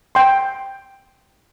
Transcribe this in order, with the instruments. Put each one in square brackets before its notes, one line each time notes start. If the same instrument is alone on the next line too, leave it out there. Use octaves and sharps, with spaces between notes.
[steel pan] G5 C6